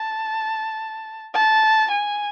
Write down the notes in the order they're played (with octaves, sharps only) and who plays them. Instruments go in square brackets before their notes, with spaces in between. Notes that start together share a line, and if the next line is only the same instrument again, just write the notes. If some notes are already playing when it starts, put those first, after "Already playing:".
Already playing: [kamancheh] A5
A5
G#5